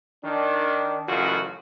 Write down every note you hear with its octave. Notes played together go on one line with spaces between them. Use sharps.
D#3 D4
A1 F#2 C#3 F4 F#4